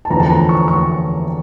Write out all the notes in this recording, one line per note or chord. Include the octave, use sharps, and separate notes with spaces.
A5
E2 D3 F3 A#5
A5
A#5
C#6
C#6